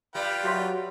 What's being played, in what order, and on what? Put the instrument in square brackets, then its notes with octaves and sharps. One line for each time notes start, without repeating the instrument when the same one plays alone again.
[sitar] G3 [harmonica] F4 B4 G5
[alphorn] F#3 [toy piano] F#4 E5 C6